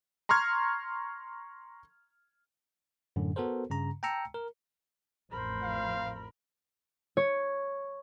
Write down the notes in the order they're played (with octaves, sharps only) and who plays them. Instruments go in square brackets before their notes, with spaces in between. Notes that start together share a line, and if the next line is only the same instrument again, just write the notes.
[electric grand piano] A#5 C6 C#6 F6 G#6
[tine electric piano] F#2 A2 D3
B3 F#4 A4 A#4 C5
G2 C#3 A#5
G5 A5 A#5 E6 C#7
A#4
[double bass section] A1 F2 [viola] A#4 B5 [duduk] C5
[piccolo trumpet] F5
[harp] C#5